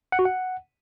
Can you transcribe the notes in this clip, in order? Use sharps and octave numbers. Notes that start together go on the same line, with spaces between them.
F#5
F#4
F#5